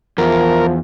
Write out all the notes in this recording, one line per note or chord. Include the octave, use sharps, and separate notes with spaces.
E2 F3 A#4